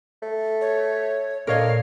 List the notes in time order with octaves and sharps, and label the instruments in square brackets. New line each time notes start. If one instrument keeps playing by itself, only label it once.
[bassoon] A3
[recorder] C#5
[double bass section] A#2 [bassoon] D3 [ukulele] A#4 C#5 D#5 [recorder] F5